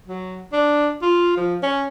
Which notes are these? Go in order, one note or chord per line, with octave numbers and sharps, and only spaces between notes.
F#3
D4
F4
F3
C#4